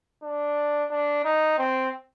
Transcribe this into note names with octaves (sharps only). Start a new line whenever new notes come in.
D4
D4
D#4
C4